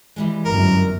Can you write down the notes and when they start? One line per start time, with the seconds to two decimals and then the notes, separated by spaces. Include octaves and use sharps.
0.16 E3 G3 G#3
0.45 G1 F#2 A#4